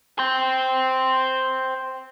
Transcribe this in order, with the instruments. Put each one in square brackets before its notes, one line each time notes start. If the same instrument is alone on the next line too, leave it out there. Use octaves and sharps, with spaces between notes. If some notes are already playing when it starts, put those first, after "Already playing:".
[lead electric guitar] C5 G5